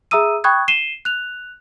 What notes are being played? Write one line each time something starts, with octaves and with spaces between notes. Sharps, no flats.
G#4 E5 A#5 D#6 E6 D#7
G5 B5 C#6 D#6 F#6 G#6
C7 D#7 E7 G7
F#6 F7